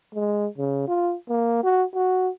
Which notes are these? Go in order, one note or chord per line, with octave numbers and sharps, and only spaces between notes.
G#3
C#3
F4
A#3
F#4
F#4